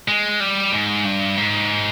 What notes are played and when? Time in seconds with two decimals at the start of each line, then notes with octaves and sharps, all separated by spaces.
0.08 G#3
0.40 G3
0.72 G#2
1.04 G2
1.37 G#2